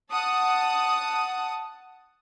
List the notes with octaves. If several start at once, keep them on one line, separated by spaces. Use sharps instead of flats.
F#5 A5 D#6